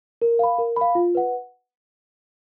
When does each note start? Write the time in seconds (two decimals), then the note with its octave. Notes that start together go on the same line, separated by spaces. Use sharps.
0.22 A#4
0.39 F5 B5
0.58 A#4
0.76 F5 B5
0.95 F4
1.15 B4 F#5